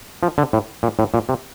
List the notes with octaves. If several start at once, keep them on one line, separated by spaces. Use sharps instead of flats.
F3
D3
A2
A#2
A2
A#2
C3